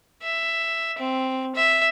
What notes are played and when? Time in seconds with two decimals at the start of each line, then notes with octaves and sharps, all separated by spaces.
0.23 E5
0.99 C4
1.55 E5